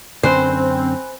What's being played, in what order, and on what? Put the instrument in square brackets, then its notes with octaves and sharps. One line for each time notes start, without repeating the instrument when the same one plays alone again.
[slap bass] F#2 D3 C#4 [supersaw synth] C4 [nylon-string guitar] C5 [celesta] G#5 B5 F#6